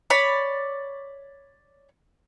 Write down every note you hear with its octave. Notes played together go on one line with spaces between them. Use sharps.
C#5 D5 B5